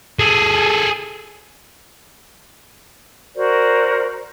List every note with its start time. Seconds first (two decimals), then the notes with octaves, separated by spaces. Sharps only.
0.19 G#4 A4
3.35 F#4 A#4 C5 D5